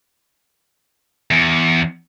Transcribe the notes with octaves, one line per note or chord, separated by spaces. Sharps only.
E2